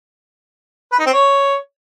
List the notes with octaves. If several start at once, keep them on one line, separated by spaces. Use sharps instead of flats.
B4
D#4
C4
C#5